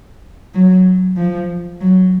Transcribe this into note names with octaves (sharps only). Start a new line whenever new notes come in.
F#3
F3
F#3